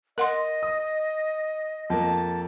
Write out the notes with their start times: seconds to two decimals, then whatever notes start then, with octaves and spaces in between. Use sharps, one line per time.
0.18 A#4 D#5 F#5 C6
0.63 D#6
1.90 F2 A#3 A5